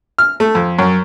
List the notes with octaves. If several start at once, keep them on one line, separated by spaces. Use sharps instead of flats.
F6
A3
F2
F#2